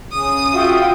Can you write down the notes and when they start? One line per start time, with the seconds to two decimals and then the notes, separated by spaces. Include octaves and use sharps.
0.12 C#3 D#6
0.54 F4 F#4 E5 G5